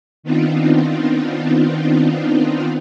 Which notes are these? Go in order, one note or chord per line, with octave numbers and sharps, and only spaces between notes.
D#3 B3 C4 D4 D#4 F4